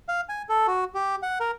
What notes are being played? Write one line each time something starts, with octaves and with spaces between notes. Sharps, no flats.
F5
G#5
A4
F#4
G4
F#5
A#4